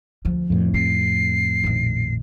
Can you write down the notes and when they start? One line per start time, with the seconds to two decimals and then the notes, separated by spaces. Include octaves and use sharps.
0.25 D2 F3
0.50 F2 A2
0.74 C4 C7
1.64 A#1 D#3